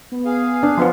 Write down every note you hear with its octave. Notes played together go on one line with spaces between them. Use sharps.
B3
G#4 F5
D4
F3 B3 F4